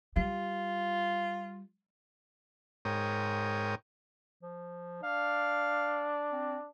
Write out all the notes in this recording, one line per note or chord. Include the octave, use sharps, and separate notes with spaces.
G3 F4
G#2 A#4 C#5 G5 D#6
F3
D4 F5
C4